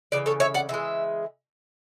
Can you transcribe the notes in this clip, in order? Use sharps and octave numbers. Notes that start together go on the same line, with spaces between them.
C#3 E3 D5
A4 C#5
C#5 E5
D5 F#5
C#3 E3 G#3 E5